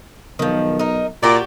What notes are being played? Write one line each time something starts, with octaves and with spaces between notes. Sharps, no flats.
B1 D#3 F3
D#4 A#4
A#2 F#4 G4 D5